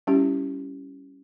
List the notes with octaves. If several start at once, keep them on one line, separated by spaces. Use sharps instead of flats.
G3 C#4 E4 G4